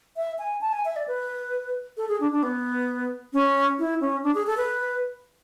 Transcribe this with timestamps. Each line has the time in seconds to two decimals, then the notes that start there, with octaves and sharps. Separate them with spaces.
0.17 E5
0.39 G#5
0.61 A5
0.73 G#5
0.85 E5
0.96 D5
1.08 B4
1.97 A4
2.09 G#4
2.20 D4
2.32 D4
2.43 B3
3.33 C#4
3.79 E4
4.01 C#4
4.23 D4
4.35 G#4
4.47 A4
4.57 B4